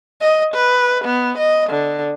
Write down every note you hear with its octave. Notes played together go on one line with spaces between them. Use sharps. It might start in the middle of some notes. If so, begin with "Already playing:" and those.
D#5
B4
B3
D#5
D3